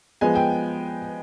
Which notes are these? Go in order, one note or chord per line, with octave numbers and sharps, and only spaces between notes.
F3 G#3 B3 G#5
G5